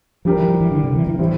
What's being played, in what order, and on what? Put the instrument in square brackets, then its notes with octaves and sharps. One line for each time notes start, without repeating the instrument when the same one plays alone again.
[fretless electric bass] F3 [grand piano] G3 D4 G4 A#4
[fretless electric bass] E3
F3
E3
D3
C3
E3
E3
F3
[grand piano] A2 G3 C4 [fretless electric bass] E3